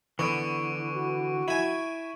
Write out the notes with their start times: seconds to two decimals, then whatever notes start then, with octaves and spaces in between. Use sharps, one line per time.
0.19 D3 E3 B3 C#6 D7
0.96 F#4
1.48 E4 G#5